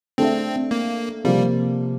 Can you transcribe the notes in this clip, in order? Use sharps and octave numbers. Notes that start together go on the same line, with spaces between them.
A3 C4 D4 A4 E5
A#3
C3 F3 G3 A#3 F4